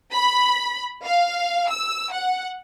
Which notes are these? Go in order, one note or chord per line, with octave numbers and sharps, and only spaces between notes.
B5
F5
E6
F#5